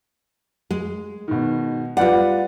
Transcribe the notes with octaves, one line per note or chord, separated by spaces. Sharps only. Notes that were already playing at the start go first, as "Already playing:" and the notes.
G#3
B2 D#3
G3 F4 B4 D5 F#5